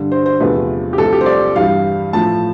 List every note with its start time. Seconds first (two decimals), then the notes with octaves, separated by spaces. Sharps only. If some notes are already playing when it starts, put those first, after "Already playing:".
Already playing: G2 D3 G3
0.12 C5
0.26 C5
0.40 E2 C3 F3 A3 B4
0.93 G4
0.98 C2 C3 F3 A3 A4
1.13 G4
1.21 C5
1.26 D5
1.55 G2 E3 G3 F5
2.13 A2 F3 A3 A5